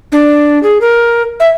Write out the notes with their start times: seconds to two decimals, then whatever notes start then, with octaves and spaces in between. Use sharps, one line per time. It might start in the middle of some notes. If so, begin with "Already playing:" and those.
0.12 D4
0.63 G#4
0.81 A#4
1.40 E5